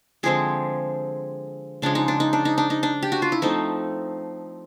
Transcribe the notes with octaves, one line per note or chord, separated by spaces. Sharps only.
D3 F3 G#3 C4 G#4
C#3 F3 G#3 D4
D#4
D4
D#4
D4
D#4
D4
D#4
D4
G4
F#4
F4
E4
F3 A3 C4 D#4